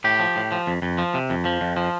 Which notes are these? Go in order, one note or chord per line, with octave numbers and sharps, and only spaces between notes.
A2 G4
F3
A2
F3
F2
F2
F3
C3
F2
F3
F2
F3